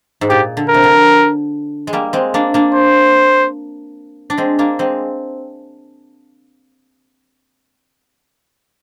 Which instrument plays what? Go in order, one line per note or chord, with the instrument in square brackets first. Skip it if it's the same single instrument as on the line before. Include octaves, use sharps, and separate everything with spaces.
[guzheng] G#2
[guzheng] A#2 [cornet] G4
[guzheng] D3
[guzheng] C3 [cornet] A#4
[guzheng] D3
G#3
G3 A#3
G#3 C4
A#3 D4
A#3 D4
[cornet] C5
[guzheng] D4
G#3 C4
A#3 D4
G#3 C4